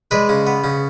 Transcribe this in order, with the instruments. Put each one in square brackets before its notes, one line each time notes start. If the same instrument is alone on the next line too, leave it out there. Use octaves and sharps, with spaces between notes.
[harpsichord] G#3 B4 D5
C#3
B3
C#3